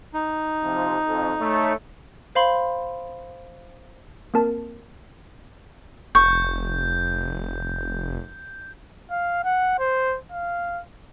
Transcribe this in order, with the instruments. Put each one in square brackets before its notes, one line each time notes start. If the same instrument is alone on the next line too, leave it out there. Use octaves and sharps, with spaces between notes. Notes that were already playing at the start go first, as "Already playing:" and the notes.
[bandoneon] D#4
[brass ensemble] C3 F3
F2
A3 C#5
[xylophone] C5 F5 B5 C6
[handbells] A#3 C4 A#4 A5
[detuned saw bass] F1 [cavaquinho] C#6 [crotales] G6
[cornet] F5
F#5
C5
F5